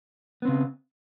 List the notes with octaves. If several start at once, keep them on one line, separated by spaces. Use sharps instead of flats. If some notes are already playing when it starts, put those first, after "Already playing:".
C#3 B3 C4